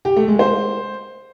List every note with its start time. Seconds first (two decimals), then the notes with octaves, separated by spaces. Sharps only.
0.05 G4
0.16 A3
0.28 G#3
0.39 C5